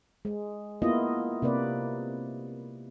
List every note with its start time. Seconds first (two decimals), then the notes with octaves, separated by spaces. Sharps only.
0.25 G#3
0.82 A#3 B3 E4 F4 D#5
1.42 C3 A#3 B4 D5